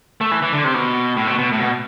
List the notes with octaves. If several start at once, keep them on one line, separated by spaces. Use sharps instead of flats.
A3
E3
E3
D3
C3
B2
A2
B2
B2
A2
B2